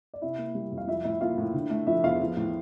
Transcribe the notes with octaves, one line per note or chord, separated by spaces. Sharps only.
D5
C3 E4 E5
A#3
G3
F2
F5
F3 E4 E5
A2 E4 E5
A#3 F4 F5
A2
D3
A3
F3 E4 E5
E2 F4 F5
F3
A2